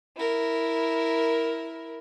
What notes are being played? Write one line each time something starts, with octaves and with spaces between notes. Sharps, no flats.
E4 A#4